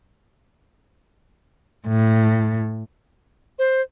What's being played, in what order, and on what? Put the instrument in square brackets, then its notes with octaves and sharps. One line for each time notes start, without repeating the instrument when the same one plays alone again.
[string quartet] A2
[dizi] C5